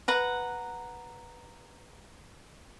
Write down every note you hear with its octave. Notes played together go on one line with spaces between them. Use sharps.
B4 F#5 A#5